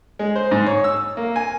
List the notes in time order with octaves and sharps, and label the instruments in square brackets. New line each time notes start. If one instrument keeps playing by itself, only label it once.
[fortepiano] G#3
C5
G#2
C#5
E6
A#3
G#5